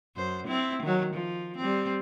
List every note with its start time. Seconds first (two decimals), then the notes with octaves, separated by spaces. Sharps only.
0.16 F#2 C5
0.47 C4 E4
0.83 D#3 F#3
1.14 F3
1.57 G3 C4